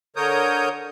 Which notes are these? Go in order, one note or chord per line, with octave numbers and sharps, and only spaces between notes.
D3 A#4 C#5 D#6 G6